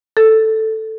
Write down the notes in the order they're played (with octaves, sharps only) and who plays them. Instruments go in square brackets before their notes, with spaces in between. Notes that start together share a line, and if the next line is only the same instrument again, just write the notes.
[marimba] A4